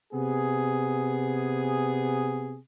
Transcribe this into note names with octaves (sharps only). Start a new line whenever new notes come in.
C3 B3 G#4